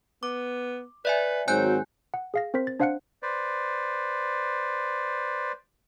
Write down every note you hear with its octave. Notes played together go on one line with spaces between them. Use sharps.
B3 D6
B4 D5 E5 G#5
G#1 F#3 C4 G#5 F#6 G6
F#5
G#4 F5 A#6
C4 A#4 C5 B6
A6
D4 C5 F5 F#5 F#6 C#7
B4 C5 D5